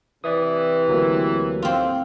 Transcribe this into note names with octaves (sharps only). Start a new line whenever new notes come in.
C3 E3 D5 E5 D#6
D2 F#3 A#3
C4 F4